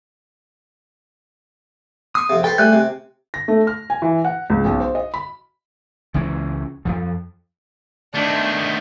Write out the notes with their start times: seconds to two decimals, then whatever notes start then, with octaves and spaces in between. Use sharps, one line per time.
2.15 C6 C#6 D#6
2.30 F2 C3
2.44 A4 B4 C5 G5
2.58 G3 A3 G#5 F#6 G6
2.73 C3
3.34 A#6
3.48 A3
3.67 F6
3.90 G#5
4.02 E3
4.25 F#5
4.50 C#2
4.65 B1
4.80 C5
4.95 D#5
5.14 B5
6.14 C#2 E3 C#4
6.85 F2 F3
8.14 D#3 A3 D4